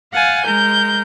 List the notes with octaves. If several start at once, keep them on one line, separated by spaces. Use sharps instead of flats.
F5 F#5 G#5 A6
G#3 A#4 G6